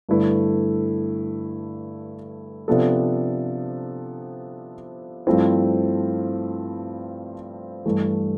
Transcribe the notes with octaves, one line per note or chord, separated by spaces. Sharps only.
G2 D3 A3 E4 B4
C3 F3 B3 D4 A4
G2 F3 A3 C4 E4
G2 E3 A3